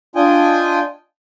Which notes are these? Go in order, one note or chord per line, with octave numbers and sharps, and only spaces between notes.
D4 F4 D#5 G5 G#5